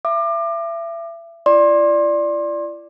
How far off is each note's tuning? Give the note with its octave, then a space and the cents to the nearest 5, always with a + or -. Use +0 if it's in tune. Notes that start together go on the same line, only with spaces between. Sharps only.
E5 +30 D6 +30
E4 +45 D5 +0 C6 +30